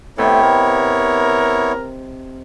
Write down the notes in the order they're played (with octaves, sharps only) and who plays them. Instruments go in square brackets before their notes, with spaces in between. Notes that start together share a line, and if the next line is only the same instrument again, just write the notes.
[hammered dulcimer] C3 D#5 [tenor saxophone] A3 [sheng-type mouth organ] B3 E4 C#5
[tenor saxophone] A#4